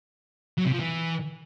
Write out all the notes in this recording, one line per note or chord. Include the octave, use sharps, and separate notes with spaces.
F#3
C3
F3
E3